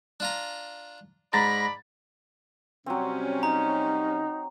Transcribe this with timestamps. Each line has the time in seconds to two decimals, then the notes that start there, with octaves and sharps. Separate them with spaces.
0.20 D4 F4 A#5
1.33 G#2 D5 A#5 B5 A6 A#6
2.86 C3 F#3 G3 C4 C#4
3.43 D#4 A#5